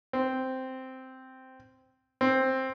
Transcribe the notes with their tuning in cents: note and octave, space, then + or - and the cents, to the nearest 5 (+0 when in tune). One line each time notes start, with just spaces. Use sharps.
C4 -5
C4 +10